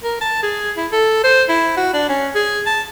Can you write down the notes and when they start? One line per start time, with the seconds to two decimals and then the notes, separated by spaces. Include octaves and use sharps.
0.04 A#4
0.21 A5
0.43 G#4
0.77 E4
0.92 A4
1.24 C5
1.49 E4
1.77 F#4
1.93 D4
2.09 C#4
2.35 G#4
2.66 A5